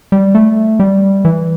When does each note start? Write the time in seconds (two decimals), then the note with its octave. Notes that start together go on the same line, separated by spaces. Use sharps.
0.12 G3
0.35 A3
0.80 G3
1.25 E3